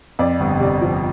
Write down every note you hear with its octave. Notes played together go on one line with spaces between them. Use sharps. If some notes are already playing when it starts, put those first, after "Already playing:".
F2 D5
G1
C3 D5
F3